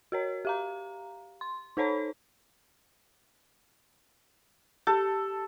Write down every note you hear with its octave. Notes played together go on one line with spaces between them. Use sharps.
F#4 A#4 C#5
G4 F5 A#5
C6
D#4 A4 C5 C#5 B5
G4 A4